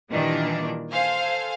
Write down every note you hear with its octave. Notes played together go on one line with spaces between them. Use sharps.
A#2 D#3 E3 G3 A#3 D4
A4 C5 F5 G#5